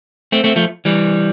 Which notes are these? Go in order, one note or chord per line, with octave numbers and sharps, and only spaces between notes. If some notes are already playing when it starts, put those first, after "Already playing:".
A3 C4
A3 C4
F3 A3
E3 G3